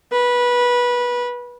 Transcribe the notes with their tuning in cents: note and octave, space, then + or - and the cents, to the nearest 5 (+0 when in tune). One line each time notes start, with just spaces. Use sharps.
B4 -20